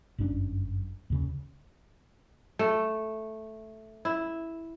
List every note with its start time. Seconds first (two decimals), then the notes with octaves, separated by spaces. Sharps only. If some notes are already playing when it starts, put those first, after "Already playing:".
0.18 G1 F#2 C#4 D4
1.10 D#2 C#3
2.59 A3
4.05 E4